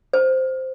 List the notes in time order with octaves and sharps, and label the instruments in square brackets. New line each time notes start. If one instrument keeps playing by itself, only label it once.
[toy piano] C5